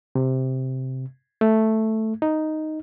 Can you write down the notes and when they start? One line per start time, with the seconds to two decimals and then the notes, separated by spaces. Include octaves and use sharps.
0.15 C3
1.41 A3
2.22 D#4